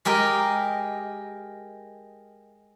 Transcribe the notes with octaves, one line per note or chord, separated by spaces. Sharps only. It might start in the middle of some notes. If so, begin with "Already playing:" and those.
G#3 G4 A#4 D#5